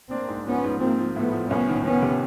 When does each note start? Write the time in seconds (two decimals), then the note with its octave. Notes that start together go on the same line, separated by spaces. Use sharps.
0.11 A#3 C4 D4
0.28 G#2
0.46 F3 B3 C#4
0.64 G#2
0.80 F3 A#3 C4
0.99 F3
1.15 A2 A3 B3
1.33 F3
1.50 C2 B3 C#4
1.68 D#3
1.84 D#3 B3 C#4
2.02 C3